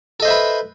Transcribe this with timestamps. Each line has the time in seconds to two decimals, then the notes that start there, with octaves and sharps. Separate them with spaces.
0.20 A4
0.22 D#5
0.25 C5
0.28 E5
0.30 B4